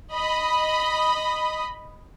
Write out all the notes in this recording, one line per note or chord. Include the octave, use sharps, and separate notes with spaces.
D#5 B5